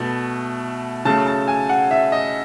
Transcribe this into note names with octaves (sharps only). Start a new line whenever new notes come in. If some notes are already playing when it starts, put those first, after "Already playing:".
Already playing: B2 A3
C#3 F#3 A3 A5
A5
G#5
F#5
E5
D#5